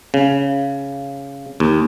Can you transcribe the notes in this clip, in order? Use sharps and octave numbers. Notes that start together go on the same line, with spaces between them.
C#3
D#2